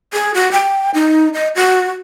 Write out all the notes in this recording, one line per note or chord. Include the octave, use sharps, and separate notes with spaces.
G#4
F#4
G5
D#4
D#5
F#4